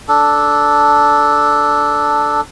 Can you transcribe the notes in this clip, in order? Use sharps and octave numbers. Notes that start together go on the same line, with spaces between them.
D4 A4